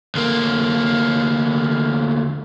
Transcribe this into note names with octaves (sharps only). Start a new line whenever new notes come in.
D2 A#3